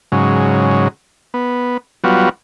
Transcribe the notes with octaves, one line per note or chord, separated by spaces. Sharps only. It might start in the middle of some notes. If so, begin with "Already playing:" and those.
G#2 C#3 F#3
B3
F#3 G3 B3 F4 F#4